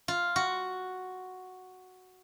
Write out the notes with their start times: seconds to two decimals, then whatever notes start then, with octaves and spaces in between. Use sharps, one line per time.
0.08 F4
0.36 F#4